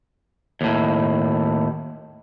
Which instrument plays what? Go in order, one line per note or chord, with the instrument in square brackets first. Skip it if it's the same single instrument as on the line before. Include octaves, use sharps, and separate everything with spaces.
[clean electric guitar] D#2 A2